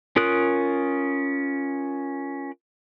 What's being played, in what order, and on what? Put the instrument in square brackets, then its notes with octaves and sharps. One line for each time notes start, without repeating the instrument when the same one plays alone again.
[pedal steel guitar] C#4 F4 A#4 D#6 F#6